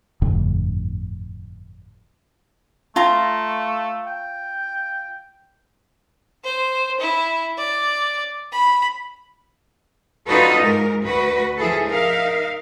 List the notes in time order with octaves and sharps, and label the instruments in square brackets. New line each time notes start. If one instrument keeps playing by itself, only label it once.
[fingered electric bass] G1 F2 A2 D3
[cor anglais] A3 [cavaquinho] F4 A#5
[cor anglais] G5
[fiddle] C5
E4
D5
B5
[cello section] D4 D#4 F4 F#4 A4 B4
G#2 A#4
D2 F#4 B4
F3 E4 G#4 A4
D#4 A#4 E5 F5